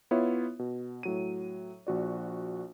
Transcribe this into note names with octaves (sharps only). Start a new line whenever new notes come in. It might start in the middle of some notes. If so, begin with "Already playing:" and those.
B3 E4 F4 C#5 E5
B2
A2 F#3 D#7
A#1 F#4 D5